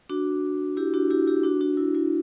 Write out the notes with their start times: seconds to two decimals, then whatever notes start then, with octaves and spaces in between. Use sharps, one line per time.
0.10 D4 F#4
0.77 E4 G4
0.94 D4 F#4
1.10 E4 G4
1.27 E4 G4
1.44 D4 F#4
1.61 D4 F#4
1.77 E4
1.95 E4